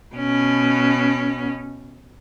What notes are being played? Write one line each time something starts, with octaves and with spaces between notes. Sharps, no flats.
B2 C#4